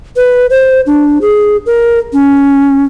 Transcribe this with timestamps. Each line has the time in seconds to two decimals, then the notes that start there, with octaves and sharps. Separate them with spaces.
0.16 B4
0.50 C5
0.86 D4
1.21 G#4
1.66 A#4
2.13 C#4